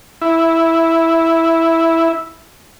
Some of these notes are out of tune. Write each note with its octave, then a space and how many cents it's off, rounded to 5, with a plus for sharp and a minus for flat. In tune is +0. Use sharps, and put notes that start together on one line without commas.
E4 -5